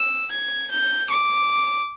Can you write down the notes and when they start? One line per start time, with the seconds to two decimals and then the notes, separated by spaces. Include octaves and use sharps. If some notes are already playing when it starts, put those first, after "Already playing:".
Already playing: E6
0.31 G#6
0.70 G6
1.10 D6